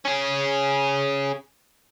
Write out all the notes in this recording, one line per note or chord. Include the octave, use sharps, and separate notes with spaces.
C#4 G#4